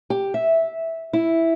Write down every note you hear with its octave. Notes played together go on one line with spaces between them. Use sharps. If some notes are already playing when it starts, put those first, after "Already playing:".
G4
E5
E4